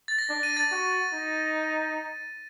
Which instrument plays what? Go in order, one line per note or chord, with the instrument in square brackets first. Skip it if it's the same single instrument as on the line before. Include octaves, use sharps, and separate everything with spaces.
[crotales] A6
A#6
[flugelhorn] D4
[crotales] D#7
A6
[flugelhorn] F#4
D#4